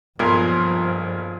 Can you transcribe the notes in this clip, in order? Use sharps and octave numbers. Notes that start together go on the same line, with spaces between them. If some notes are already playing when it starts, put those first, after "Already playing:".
B1 G2 A#2 F3 F4 G#4 A#4 B4